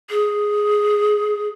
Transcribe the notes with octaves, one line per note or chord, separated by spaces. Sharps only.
G#4